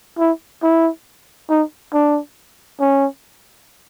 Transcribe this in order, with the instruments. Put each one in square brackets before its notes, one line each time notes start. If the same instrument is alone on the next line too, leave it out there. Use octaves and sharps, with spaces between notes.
[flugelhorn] E4
E4
D#4
D4
C#4